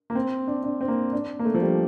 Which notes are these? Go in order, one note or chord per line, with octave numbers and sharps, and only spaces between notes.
A#3
C4
D4
D4
C4
A#3
D4
A#3
A3
F3
G3